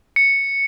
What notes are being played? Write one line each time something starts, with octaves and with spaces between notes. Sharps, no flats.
C#7